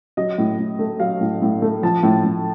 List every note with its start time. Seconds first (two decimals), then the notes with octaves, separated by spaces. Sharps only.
0.17 F#3 D#5
0.38 A2
0.59 A2
0.79 A3
1.00 F#3 F5
1.21 A2
1.42 A2
1.62 A3
1.83 F3 A5
2.03 A2
2.24 A2